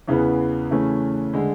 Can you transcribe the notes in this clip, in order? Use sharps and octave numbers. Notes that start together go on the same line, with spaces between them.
E2 C#3 E3 B3
C#3 E3 A3 C#4
D3 G#3